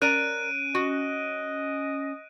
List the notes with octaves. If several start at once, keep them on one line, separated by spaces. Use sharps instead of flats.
C#4 A#4 D5 A#5 F#6 D7 D#7
F#4 D#5